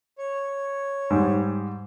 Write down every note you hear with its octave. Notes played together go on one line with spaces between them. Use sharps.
C#5
G#2 G3